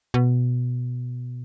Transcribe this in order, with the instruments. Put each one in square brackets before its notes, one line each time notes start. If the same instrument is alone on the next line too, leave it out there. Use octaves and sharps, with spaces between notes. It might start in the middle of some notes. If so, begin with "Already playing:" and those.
[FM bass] B2